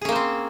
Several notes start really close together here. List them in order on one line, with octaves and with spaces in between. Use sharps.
G#4 C#4 A#3 C5 C4